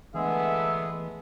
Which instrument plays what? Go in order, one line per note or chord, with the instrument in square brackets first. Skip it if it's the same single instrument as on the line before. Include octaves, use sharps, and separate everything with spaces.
[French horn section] D3 A3 B3 [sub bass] E3 [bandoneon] G#3 G#4 [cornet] E5